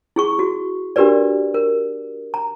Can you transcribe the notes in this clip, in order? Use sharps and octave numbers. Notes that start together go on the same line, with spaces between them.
E4 G#4 C#6
F#4
D4 F#4 G4 A#4 B4 D5
A#4
A#5